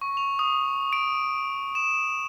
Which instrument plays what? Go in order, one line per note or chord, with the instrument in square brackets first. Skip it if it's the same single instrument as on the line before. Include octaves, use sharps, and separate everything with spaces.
[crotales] C#6
F7
D#6
D7
E7